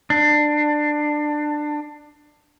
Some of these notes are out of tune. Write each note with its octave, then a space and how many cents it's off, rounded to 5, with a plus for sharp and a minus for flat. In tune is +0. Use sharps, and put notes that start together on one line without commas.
D4 +20